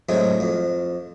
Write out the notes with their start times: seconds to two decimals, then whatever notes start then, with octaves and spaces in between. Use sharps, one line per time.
0.09 A2 C3 F#3 G#3
0.40 F2